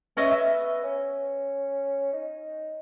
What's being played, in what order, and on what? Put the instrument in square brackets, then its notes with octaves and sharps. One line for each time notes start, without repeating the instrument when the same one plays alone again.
[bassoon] B3 [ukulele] C#4 D#5 E5
[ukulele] E5
[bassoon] C#4
D#4